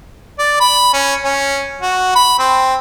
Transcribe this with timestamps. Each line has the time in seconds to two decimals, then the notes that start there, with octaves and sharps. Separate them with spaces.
0.39 D5
0.60 B5
0.93 C#4
1.24 C#4
1.81 F#4
2.15 B5
2.39 C4